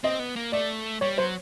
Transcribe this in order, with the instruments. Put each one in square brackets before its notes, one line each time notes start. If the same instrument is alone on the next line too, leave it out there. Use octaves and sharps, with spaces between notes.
[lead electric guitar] C4 [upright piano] D#5
[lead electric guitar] B3
A#3
[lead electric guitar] A3 [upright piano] D5
[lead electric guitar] G3 [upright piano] C#5
[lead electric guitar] F#3 [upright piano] C5